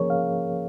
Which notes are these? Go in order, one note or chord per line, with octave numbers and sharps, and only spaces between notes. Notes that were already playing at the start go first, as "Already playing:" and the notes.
Already playing: F3 A#3 C#4 G#4 A#4 C#5
F5